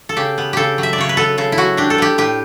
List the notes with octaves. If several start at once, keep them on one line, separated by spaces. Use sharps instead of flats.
A4
C#3 G4
B3
C#3 G4 A4
F#3
E5
D5
C#3 C#5
B4
B3 A4
C#3 A4
E4
F#3 F#4
D4 G4
A4
B3 G4
A2 G4